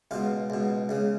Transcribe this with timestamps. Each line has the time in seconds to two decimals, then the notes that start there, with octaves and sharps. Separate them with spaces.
0.11 C#2 B2 F4
0.50 C#2 B2
0.89 C#2 C#3